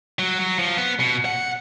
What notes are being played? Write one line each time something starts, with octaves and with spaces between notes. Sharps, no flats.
F#3
F#3
F3
B3
B2
F#5